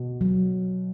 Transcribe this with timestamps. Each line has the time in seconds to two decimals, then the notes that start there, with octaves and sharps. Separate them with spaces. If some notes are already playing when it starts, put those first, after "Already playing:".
Already playing: B2
0.21 F#3